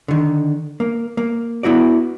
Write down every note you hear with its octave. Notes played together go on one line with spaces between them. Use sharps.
D3 D#3
A#3
A#3
B3 E4 F#4 D5